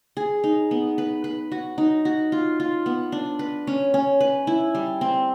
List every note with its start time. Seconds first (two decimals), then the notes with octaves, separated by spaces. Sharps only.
0.17 G#4
0.44 D#4
0.71 B3
0.98 B4
1.24 B4
1.52 F#4
1.78 D#4
2.05 F#4
2.32 F4
2.60 F4
2.86 B3
3.12 D4
3.39 B4
3.67 C#4
3.94 C#4
4.20 B4
4.47 E4
4.75 G3
5.01 C4